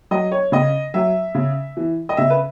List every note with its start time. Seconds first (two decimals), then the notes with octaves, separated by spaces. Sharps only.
0.11 F#3 D#5
0.32 C#5
0.52 C#3 D#5
0.94 F#3 E5
1.35 C#3
1.77 E3
2.09 D#5
2.17 C#3 E5
2.30 B4